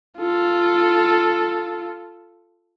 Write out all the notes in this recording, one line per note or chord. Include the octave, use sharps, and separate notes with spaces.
F4 A4